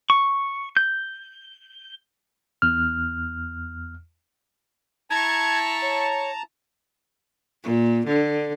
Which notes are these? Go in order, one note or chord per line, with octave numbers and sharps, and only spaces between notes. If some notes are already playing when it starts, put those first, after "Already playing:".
C#6
G6
E2 F6
E4 A5 A#5 C#6 G#6
C#5
A#2
D3